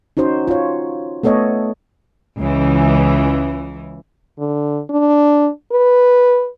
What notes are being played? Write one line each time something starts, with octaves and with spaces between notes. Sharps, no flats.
C#4 D#4 F#4 C5
F4 C#5
A3 B3 A4 C#5 D#5
C#2 E3
D3
D4
B4